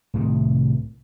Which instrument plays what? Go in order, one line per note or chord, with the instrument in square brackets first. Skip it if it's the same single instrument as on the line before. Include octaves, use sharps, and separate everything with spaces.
[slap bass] C2 A2 C3 D#3